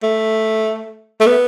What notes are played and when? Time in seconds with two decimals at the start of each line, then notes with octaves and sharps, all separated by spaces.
0.03 A3
1.21 A3
1.27 B3